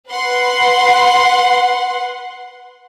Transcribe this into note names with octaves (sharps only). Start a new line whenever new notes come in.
B4 F#5 C6